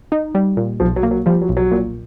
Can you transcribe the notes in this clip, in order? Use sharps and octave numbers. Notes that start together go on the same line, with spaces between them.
D#4
G3
A#2
B1 F3
F#3
A#3
F#3
F3 G3
F#3
B1
F#3
A#2